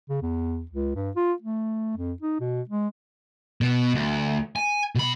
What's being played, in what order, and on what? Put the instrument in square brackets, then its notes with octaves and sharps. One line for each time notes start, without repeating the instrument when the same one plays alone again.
[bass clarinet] C#3
E2
C#2
G2
F4
A3
F2
D#4
B2
G#3
[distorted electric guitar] B2
D2
G#5
B2 B5